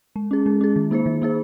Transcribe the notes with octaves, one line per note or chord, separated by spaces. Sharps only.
G#3
C#4 G#4
G#3
C#4 G#4
D#3
A#3 D#4 G#4 C5
D#3
A#3 D#4 G#4 C5